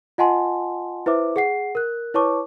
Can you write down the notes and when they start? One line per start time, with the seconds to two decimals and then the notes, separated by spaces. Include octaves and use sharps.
0.18 F4 D#5 F#5 G#5 A5 C6
1.06 E4 B4 C5 E5 D6
1.36 G#4 F#5 C7
1.75 A#4 F#6
2.14 E4 B4 C#5 A5 C#6 D6